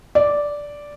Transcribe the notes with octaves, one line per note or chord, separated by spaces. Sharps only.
D5